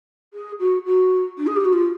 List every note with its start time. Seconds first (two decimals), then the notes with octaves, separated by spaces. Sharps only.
0.33 G#4
0.59 F#4
0.85 F#4
1.37 D4
1.46 G#4
1.56 G4
1.64 F#4
1.72 F4